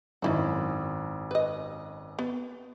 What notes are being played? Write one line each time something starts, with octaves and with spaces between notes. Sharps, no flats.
G#1 F#2 D#4 E4 F#4
B4 D#5
B3